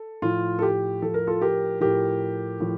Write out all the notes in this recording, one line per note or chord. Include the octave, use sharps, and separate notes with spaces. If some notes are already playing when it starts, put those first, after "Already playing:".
Already playing: A4
A2 F3 F4
A4
G4
A2 F3 A4
A#4
F4 A4
G4 A#4
A2 F3 G4 A#4
A2 F3